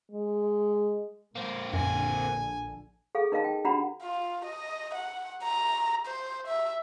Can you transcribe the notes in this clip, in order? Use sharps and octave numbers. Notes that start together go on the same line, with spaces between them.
G#3
A#2 A#3 C4
A#1 F#2 D3 G#5
G#4 A4 F5
D#4 A#4 D#5 F5 A5
G5
D4 F#4 G4 F#5 A#5 B5
F4
D#5
F#5
A#5
C5
E5